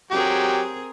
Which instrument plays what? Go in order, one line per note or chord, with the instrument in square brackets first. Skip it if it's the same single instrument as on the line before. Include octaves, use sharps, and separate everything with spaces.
[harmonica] F#3 G4 [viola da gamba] C4 G#4 A#4